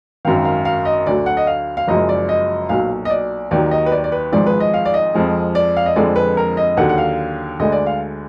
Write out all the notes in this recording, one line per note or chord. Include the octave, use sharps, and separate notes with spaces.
G#1 F#2 D#3 F5
F5
F5
D#5
D2 D3 F#3 D5
F#5
D#5
F5
F5
F#1 F#2 F3 G#3 D#5
D5
D#5
B1 A#2 F#3 F5
D#5
D5
D#2 D#3 F#3 D5
D#5
B4
D5
D5
B4
G#1 G#2 F3 G#3 D5
B4
D#5
F5
D5
D#5
F2 F3 G#3
D5
F5
D#5
F2 D3 F3 G#3 D5
B4
A#4
D#5
D#2 D3 F#3 F#5
F#5
F5
D2 D3 G#3 D#5
D5
F5